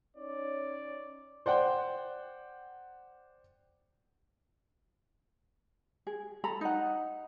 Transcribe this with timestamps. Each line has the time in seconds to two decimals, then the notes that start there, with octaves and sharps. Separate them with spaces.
0.17 C#4 D#4 C#5 D5
1.46 C5 D5 F#5 G5
6.07 G#4
6.44 A4 A#5 B5
6.61 D#4 F#5